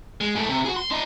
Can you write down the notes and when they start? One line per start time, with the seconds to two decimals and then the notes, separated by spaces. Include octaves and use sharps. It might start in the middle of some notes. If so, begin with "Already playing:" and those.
0.21 G#3
0.35 G#2 A3
0.49 C3
0.65 F#4 G#4
0.76 C6
0.91 D4 D#5